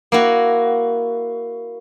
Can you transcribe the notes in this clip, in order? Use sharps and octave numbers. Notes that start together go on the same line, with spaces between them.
A#3 E4 F#4